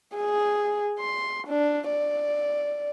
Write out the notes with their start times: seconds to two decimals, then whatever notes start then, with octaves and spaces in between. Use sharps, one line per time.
0.17 G#4
0.99 C6
1.47 D4
1.89 D5